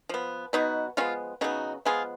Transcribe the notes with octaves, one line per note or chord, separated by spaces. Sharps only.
F3 B3
B2 F#3 B3 D#4 F#4
F3 G#3 B3 C#4 F4
C#3 F#3 B3 D#4 F#4
F3 G#3 B3 F4 G#4